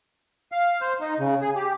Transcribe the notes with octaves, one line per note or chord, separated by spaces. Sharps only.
F5
C5
D#4
C#3
G#4
G4